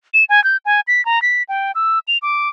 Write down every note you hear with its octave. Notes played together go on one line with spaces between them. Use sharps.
E7
G#5
G6
G#5
B6
A#5
B6
G5
E6
F7
D6